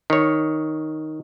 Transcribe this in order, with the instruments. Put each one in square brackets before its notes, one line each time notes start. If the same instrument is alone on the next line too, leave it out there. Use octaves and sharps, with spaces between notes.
[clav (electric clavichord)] D#3 C#5